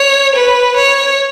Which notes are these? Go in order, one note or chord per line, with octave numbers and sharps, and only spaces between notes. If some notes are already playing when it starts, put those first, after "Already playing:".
Already playing: C#5
B4
C#5